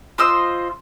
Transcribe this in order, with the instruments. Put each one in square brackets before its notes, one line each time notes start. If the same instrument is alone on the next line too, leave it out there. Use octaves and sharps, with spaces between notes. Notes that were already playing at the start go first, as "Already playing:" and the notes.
[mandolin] F4 C5 D#5 E6